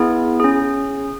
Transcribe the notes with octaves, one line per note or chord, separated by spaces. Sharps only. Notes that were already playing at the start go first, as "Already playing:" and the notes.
Already playing: B3 E4 G#4
C#4 G#4